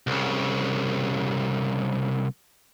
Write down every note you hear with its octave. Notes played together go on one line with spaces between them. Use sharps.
C2 C#3